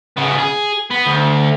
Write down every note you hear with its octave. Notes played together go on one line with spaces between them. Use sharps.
C#3 B3
G#4
B3
D2